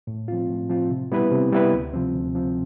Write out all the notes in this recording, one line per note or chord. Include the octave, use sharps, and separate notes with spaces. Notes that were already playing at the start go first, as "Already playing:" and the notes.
A2
F3 C4 F4
A2
F3 C4 F4
C3
G3 B3 E4 B4
C3
G3 B3 E4 B4
D2
C3 F3 C4
D2
C3 F3 C4